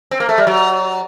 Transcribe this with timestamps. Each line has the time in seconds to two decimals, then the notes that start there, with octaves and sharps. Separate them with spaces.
0.11 C4
0.20 A#3
0.29 A3
0.38 G3
0.47 F#3